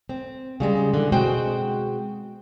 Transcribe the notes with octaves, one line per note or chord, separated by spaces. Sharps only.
C4
C#3 G3 G#3
D3 E3
B2 G#3 C4 F#4 C5 G5